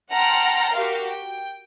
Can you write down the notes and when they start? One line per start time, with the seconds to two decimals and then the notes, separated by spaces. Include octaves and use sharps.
0.13 F#5 G5 A5 A#5 C6 F6
0.76 F#4 G4 A#4 F5
1.10 G5